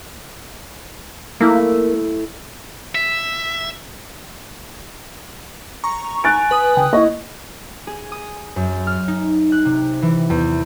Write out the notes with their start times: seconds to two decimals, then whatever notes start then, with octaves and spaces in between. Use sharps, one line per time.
1.40 A3 A#3 E4
2.95 E5
5.84 A#5 C#6
6.24 G#5 F#6 A6 D7
6.51 B4 D#6
6.77 C2 C#3 G5
6.93 A#3 E4 D#5 C#6
7.87 G#4
8.12 D#6
8.56 F#2
8.87 F6
9.08 D#4
9.52 F#6
9.65 C3
10.02 E3
10.30 E2